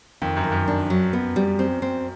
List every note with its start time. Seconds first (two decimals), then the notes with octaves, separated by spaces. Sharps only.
0.22 F2 D#3
0.36 F#2
0.44 D#3
0.52 F#2
0.68 D4
0.90 F#3
1.13 B3
1.36 G3
1.59 C4
1.82 C4